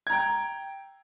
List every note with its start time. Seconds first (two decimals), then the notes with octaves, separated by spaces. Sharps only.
0.07 G#6
0.10 A#5
0.13 G5